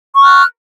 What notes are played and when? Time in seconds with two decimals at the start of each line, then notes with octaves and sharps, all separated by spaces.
0.15 C#6
0.20 F6
0.24 F#6